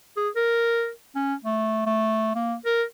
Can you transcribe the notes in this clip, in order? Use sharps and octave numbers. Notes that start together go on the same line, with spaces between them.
G#4
A#4
C#4
A3
A3
A#3
A#4